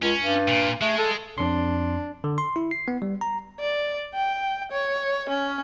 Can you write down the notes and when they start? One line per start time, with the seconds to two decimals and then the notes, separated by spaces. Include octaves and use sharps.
0.02 C#2 C#4
0.20 G2
0.48 A#2
0.81 G#3 A3
0.98 A4
1.38 F2 D4 C6
2.24 D3
2.38 C6
2.56 E4
2.71 C7
2.88 B3
3.02 G3
3.21 A#5
3.60 D5
4.14 G5
4.72 C#5
5.30 C#4